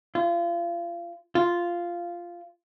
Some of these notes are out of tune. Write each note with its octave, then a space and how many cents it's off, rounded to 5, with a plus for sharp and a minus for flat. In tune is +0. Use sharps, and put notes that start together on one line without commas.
F4 -30
F4 -5